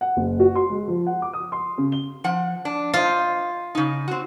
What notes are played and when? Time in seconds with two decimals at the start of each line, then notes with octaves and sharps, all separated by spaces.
0.01 F#5
0.17 F#1
0.40 F#4
0.55 C6
0.70 G#3
0.88 F3
1.07 F#5
1.22 D6
1.33 D#6
1.52 C6
1.78 C#3
1.92 G7
2.24 F3 F#5
2.65 D4
2.94 F4 C5 D#5
3.75 C#3 D#4
4.08 C4 F#4